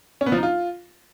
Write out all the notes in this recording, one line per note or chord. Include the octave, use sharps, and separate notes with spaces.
C#4
B3
F3
D#4
F4